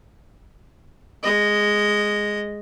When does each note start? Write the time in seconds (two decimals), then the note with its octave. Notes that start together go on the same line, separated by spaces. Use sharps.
1.23 G#3 D#5